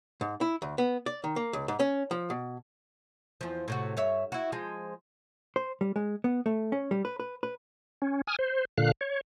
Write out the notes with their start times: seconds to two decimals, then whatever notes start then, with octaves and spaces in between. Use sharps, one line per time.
0.21 G#2
0.41 E4
0.62 D2
0.78 B3
1.06 D5
1.24 D#3
1.36 A#3
1.53 C#2
1.68 G#2
1.80 C#4
2.11 F3
2.30 B2
3.41 E2 F3
3.68 A2 C3 F#4
3.97 G2 C#5 E5
4.32 E4 F#4
4.52 F3 G#3
5.56 C5
5.81 G3
5.96 G#3
6.24 B3
6.46 A3
6.72 C#4
6.91 G3
7.05 B4
7.20 B4
7.43 B4
8.02 C#4
8.27 G#5 D#6 F6
8.39 C5
8.78 A#2 D3 F5 F#6
9.01 C#5